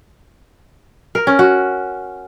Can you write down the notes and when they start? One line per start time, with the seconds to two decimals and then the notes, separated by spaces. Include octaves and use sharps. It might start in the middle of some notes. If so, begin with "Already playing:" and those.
1.15 A#4
1.27 C#4
1.39 F#4